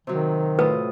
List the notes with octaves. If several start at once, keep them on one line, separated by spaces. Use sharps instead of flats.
C3 D#3 F#3
A2 F4 B4 D#6